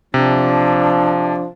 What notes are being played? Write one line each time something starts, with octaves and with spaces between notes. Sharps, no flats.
C3 F3 D4